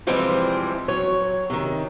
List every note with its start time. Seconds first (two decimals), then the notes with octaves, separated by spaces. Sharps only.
0.07 C3 E3 F3 G3 G#3 C4
0.88 F#3 C#5
1.50 C3 D#3